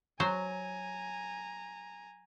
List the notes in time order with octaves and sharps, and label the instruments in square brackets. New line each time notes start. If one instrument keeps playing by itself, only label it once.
[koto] F#3 C5 [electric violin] G#5 A#5